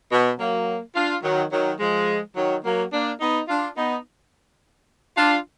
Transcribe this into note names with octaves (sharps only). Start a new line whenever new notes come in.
B2
F#3 A#3
D4 F4
D#3 F#3
D#3 F#3
F3 G#3
D#3 F#3
F#3 A#3
A#3 D4
B3 D#4
D4 F4
B3 D#4
D4 F4